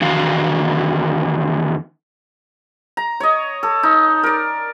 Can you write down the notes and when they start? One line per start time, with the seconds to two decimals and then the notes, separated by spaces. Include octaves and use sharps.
0.01 E2 D3 D#3 F#4 F5
2.97 A#5
3.20 C#5 D#5
3.63 A4
3.83 D#4
4.23 A#4 D5